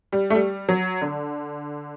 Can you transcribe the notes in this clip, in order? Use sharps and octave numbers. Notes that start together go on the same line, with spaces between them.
G3
A3
G3
F#3
D3